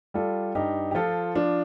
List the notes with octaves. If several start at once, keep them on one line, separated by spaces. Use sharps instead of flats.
G3 F4 A4
G2 D#4 G4
G4
F3 F4 A4
F3 D4 F4